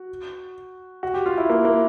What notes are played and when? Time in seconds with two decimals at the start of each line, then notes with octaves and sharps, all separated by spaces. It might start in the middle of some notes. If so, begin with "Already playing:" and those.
Already playing: F#4
1.03 F#4
1.14 G4
1.26 F4
1.38 E4
1.50 A#3
1.65 A#3